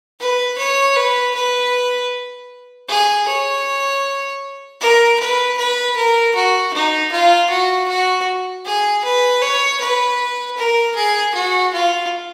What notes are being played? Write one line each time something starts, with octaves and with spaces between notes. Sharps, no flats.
B4
C#5
B4
B4
G#4
C#5
A#4
B4
B4
A#4
F#4
D#4
F4
F#4
F#4
G#4
B4
C#5
B4
A#4
G#4
F#4
F4